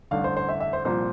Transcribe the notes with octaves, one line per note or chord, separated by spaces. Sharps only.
A1 G2 D3 F5
C5
C5
E5
E5
C5
C2 A#2 F3 C5